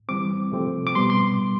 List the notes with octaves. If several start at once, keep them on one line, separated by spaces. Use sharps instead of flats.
E3 G3 C4 D6
C3 F3 A3 C4
D6
B2 G3 B3 C6
C6